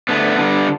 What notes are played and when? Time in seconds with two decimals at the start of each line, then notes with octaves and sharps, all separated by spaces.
0.09 D3 A3 B3
0.38 D3 G3